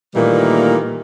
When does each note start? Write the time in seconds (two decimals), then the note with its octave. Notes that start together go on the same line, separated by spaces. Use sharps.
0.14 A#2 D#3 E3 G3 A3 A#3